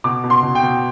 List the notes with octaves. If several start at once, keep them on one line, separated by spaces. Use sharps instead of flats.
B2 D6
B2
C6
B2
G5
B2